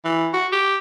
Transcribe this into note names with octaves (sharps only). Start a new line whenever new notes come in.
E3
F#4
G4